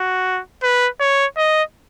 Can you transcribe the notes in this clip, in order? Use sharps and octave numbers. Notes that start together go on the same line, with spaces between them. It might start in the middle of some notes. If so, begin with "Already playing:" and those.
Already playing: F#4
B4
C#5
D#5